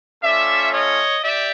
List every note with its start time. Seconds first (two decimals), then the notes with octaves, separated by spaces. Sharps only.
0.22 A3 C#4 F4 D5 E5
0.73 C#5 D#5
1.23 G4 D5 E5